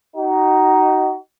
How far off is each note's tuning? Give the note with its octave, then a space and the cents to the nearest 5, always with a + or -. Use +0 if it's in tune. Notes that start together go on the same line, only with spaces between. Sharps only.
D#4 +0 F#4 +30